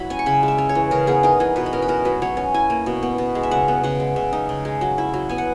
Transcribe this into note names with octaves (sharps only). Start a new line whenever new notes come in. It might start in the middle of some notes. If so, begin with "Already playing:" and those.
Already playing: F#3 E4 B5
C#4 G#5
C#6
C#3 B5
G#3
E5
C#4
C#5
E3
C#3 A#4
B3 G#4
D#4 A#4
E3 G#4
B2 B4
B4
C#4 A#4
B4
B2 A#4
F#3 B4
F#3 C#5
C#4
E4 G#5
A#3
B2
B3
B2
G#3
E5
C#3 F#5
B3
C#3 F#5
G#3
C#3 E5
D#4
C#3
G#3
F#3
E4
F#3
B3 G#5
F#5